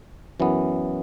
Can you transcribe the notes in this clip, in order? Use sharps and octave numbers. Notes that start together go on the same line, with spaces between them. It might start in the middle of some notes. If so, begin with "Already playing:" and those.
F#2 E3 B3